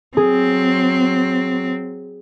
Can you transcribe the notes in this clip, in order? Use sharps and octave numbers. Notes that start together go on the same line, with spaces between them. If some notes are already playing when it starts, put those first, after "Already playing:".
F#3 C4 G#4